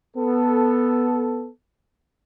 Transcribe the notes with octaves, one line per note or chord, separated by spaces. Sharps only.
B3 A4